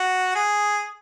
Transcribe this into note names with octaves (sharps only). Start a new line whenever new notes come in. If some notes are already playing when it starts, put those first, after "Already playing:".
Already playing: F#4
G#4